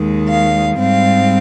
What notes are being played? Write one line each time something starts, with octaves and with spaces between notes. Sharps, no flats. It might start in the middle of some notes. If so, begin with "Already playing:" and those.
Already playing: D#2 D#3 G#3
F5
G#2 G3 C4 F5